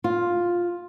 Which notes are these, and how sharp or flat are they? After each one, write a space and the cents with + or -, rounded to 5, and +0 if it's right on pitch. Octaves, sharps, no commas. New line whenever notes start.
F4 +5